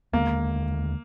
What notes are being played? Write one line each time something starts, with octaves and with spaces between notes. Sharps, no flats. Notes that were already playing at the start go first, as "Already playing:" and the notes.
D#2 D3 G#3 A#3